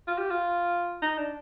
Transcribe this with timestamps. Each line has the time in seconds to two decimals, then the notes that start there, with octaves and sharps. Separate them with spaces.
0.08 F4
0.18 G4
0.30 F4
1.02 D#4
1.18 D4